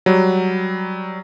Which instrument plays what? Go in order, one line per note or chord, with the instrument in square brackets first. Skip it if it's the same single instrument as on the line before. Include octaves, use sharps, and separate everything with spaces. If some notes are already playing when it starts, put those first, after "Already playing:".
[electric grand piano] F#3 G3